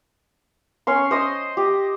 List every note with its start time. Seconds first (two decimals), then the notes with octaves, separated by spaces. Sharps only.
0.87 C#4 C#5 C6
1.11 C5 D#5 C6
1.57 G4